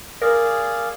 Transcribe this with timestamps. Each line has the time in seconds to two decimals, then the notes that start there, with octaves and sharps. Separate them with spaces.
0.22 G#4 A#4 D5 F5